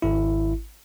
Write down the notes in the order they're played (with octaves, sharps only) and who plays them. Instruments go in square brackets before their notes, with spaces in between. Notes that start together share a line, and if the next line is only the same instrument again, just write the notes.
[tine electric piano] G#1 E4